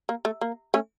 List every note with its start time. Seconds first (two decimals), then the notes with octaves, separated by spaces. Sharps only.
0.09 A#3
0.25 A3
0.41 A#3
0.74 A3 C#4